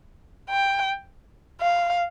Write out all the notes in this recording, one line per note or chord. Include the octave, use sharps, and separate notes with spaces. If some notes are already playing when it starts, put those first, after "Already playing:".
G5
F5